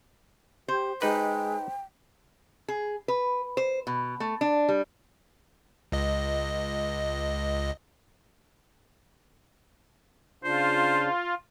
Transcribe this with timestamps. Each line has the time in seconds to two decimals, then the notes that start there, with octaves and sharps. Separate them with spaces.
0.68 G4 C5
1.02 G#3 D#4 B4 G5
2.68 G#4
3.08 B4
3.57 C5
3.87 B2
4.20 A3
4.41 D4
4.69 G3
5.92 C#2 D#5
10.44 C#3 D4 F4 C5